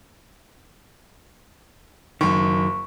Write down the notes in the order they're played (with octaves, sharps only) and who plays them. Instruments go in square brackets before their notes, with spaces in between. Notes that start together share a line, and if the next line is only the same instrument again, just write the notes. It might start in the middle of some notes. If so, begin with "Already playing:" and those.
[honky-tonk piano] F#1 [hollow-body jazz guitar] F#2 D#3 [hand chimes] C#6